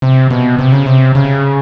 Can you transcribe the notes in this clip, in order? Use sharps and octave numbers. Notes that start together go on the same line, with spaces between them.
C3
B2
C3
C#3
C3
C#3